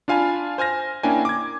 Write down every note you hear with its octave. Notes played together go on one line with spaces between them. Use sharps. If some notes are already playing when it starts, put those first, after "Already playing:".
D4 F4 F5 G#5 B5
C5 G#5 F6 A#6
A#3 C#4 D4 E4 G5 G#5
D6 G#6